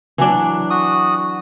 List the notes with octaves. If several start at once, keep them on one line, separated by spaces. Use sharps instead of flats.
E3 F#3 D4
F#4 D#6